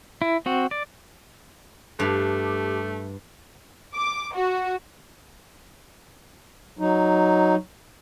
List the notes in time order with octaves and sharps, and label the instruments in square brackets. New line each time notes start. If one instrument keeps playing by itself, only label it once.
[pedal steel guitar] E4
C4 F#4
D5
[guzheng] G2 [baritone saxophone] A3 [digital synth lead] G4
[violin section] D6
F#4
[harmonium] F#3 D#4